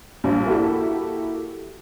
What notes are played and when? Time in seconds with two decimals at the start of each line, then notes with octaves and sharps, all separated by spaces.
0.24 A#1 G2
0.46 A#3 E4 F#4 G4 A4